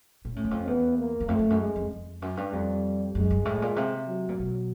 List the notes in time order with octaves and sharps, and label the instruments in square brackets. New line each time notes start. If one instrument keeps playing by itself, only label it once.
[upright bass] A#2
[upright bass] A2 [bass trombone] C#4
[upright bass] E2
F2
[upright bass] E2 [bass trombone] B3
[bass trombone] A#3
[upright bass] E2
[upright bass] F2 [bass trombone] A3
[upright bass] F2
F#2
[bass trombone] G#3
[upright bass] F2
F2
F#2
G2
[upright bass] F2 [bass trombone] G3
[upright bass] F#2 [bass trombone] G#3
[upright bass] G2
A2
A#2
C3
[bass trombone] F#3
[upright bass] A#2
B2